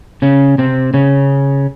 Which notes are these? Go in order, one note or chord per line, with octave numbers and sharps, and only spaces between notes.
C#3 C#4
C3 C4
C#3 C#4